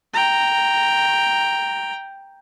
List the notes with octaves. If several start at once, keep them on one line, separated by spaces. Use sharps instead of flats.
G5 A#5